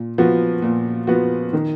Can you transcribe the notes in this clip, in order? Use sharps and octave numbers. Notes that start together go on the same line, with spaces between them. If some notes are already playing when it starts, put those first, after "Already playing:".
Already playing: A#2
F3 B3 F#4
A#2
F3 B3 F#4
D#3